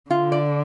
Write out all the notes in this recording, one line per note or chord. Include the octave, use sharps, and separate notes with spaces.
D3 F4
D5